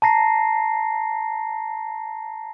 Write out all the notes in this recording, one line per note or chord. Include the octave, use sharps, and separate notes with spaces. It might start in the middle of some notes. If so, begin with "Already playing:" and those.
A5 A#5 A#6 C7